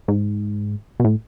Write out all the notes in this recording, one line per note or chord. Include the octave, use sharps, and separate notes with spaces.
G#2
B2
A2